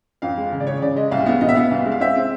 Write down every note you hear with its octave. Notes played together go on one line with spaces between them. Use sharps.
F2 F5
G#3
C#3
D5
C#3 C#5
C#3 D5
G#3 D#5
C2 F5
B3
B2 D#5
E5
B3 F5
C2
G#3
F5
C4 E5
C4